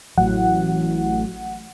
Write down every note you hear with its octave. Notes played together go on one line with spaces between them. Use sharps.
A1 F#3 F#5